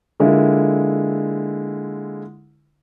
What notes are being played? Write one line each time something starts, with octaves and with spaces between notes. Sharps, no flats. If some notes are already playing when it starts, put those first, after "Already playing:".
D3 G#3 A#3 E4 F4